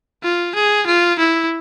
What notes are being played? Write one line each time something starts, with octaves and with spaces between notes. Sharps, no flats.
F4
G#4
F4
E4